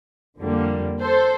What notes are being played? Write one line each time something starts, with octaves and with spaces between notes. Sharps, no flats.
F2 D3 G3 A#3
A4 C5